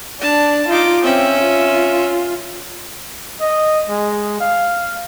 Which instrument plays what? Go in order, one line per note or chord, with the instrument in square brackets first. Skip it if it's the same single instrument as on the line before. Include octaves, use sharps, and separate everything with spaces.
[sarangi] D4 [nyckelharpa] A5
[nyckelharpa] D#4 D6 [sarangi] F4
[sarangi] C4 [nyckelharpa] C#4 E5
[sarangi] F4
[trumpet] D#5
G#3
F5